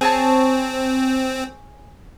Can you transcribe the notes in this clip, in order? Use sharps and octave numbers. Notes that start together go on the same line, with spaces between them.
C4 G#4 C5 C#5 A5